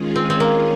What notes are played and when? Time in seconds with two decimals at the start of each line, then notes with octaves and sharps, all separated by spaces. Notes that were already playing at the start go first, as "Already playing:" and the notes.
Already playing: D#3 G#3 C#4 F4 G#4
0.16 C4
0.30 C4
0.40 A#3